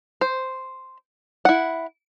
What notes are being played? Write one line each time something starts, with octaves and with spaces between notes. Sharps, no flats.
C5
E4 F#5